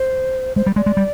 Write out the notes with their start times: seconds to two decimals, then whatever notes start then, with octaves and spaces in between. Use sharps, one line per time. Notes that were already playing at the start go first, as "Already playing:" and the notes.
Already playing: C5
0.56 G#3 C5
0.66 G3
0.76 G#3 D5
0.86 G#3
0.97 G3